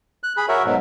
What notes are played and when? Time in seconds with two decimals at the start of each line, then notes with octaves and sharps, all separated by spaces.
0.23 F#6
0.37 G#4 B5
0.49 F#4 A#4 C#5 E5
0.64 G#2 B2 F#3